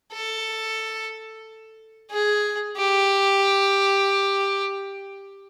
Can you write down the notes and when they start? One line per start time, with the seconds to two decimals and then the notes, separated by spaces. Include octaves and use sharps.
0.12 A4
2.11 G#4
2.77 G4